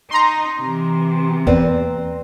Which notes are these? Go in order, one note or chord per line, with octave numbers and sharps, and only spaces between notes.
D#4 A#5 C6
C3 E3
E2 A#3 C4 B4 D5